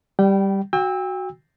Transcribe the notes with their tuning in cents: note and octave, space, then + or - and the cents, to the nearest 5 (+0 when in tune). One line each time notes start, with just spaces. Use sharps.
G3 +0 G5 -25
F#4 +0 G5 +35 E6 -15